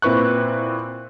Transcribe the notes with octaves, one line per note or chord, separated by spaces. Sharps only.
A#2 C4 E4 B4 C#6 F#6